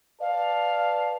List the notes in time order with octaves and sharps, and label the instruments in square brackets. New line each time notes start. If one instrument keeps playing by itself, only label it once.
[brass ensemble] B4 D5 A5 [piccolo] F5